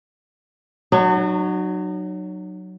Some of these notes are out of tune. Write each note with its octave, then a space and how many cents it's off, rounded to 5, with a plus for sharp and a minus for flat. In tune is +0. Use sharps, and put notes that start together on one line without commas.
F#3 +5 D#4 -40